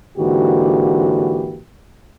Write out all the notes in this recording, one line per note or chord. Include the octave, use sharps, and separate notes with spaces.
G#2 D3 E3 A#3 F#4 G4